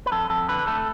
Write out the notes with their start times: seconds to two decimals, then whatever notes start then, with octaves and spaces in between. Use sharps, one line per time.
0.06 B4
0.12 F2 A4
0.30 F2 A4
0.48 D3 B4
0.67 A3 A4